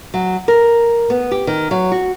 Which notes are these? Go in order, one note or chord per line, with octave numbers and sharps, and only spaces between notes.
F#3
A#4
B3
G4
D#3
F#3
F#4